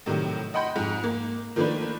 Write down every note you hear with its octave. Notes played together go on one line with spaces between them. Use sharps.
A2 C3 D#3 F#3 G3
D#5 F#5 G5 B5 C6 G6
F2 G#2
A#3
D#3 F3 A3 A#3 D4 B4